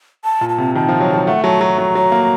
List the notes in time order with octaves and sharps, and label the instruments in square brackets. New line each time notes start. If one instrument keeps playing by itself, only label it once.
[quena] A5
[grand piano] A#2
[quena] A5
[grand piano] C3
[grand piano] D#3 [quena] A5
[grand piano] F3
F#3
F#3
[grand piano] A3 [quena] F#5
[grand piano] F#3 [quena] A5
[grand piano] F#3 [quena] A#5
[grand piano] F#3
F#3
A#3